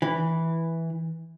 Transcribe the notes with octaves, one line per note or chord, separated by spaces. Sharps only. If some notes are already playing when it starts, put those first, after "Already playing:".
E3